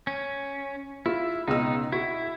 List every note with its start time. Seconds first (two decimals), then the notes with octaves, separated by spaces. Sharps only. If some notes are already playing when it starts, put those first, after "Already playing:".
0.07 C#4
1.06 E4 F4
1.48 C#2 B2 D#4 E6
1.92 E4 F#4